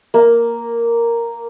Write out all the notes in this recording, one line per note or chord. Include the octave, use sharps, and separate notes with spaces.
A#3